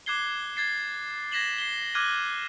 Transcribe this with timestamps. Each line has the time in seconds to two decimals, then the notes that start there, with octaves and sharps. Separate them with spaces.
0.06 D6 F#6 G#6 C7 G7
0.57 G#6 A6 C7
1.31 G#6 A#6 B6 E7 F#7 G7
1.58 C7 G7
1.95 D6 F6 F#6 G#6 D#7 G7